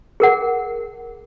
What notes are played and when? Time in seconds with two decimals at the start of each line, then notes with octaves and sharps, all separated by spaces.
0.20 G#4 A#4 F#5